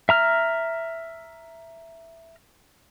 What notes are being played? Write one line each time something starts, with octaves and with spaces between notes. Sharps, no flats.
E5 A#5 F6